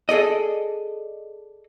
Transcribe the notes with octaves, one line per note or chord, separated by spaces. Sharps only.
G#4 A4 D5 D#5